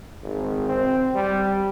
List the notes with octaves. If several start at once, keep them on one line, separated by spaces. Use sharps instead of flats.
G#1
C4
G3